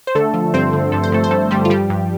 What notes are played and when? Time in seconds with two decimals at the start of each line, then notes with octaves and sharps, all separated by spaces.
0.07 C5
0.15 D3 A3 A4
0.34 F3
0.54 G2 C4 C5
0.73 D3
0.92 G2 A4
1.04 C5
1.12 G2 A3 A4
1.24 C5
1.31 G2 A3 A4
1.51 G2 G3 G4
1.65 F4
1.70 F3 G3 G4
1.90 G2